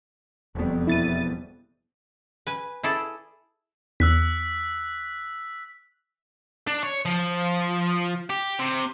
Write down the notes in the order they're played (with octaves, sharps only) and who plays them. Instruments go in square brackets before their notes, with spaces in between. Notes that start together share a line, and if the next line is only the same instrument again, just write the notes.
[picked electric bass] E1 B3 [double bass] F2 G3
[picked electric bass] E1 B3 [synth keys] E4 A6 D#7
[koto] B4 G#5
E4 G#4 A4 D5
[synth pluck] E2 [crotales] E6 F#6 B6
[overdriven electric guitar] D4
C#5
F3
G4
C3